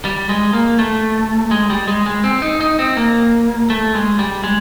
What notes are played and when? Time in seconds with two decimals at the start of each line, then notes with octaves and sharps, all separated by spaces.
0.05 G3
0.29 G#3
0.53 A#3
0.79 A3
1.51 G#3
1.70 G3
1.88 G#3
2.06 G#3
2.24 C4
2.42 D#4
2.60 D#4
2.79 C4
2.97 A#3
3.70 A3
3.95 G#3
4.19 G3
4.44 G#3